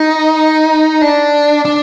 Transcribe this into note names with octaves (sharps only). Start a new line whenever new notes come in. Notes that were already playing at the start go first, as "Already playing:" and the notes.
Already playing: D#4
D4
D4